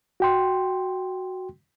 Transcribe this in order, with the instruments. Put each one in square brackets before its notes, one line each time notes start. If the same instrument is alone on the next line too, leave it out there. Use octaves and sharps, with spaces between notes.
[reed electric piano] F#4 G5 C6